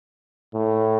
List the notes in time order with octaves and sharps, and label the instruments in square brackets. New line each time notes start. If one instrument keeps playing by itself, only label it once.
[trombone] A2